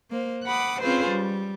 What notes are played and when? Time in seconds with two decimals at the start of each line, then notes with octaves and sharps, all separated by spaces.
0.10 A#3 C5
0.44 F#5 B5 D6 D#6
0.81 C4 C#4 F4 G#4 B4 C5
1.11 G3